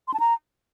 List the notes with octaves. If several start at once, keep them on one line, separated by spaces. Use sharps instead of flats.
C6
A5
A#5